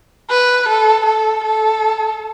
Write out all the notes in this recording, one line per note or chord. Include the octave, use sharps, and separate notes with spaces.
B4
A4
A4
A4